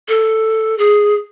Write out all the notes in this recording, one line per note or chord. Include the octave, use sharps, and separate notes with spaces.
A4
G#4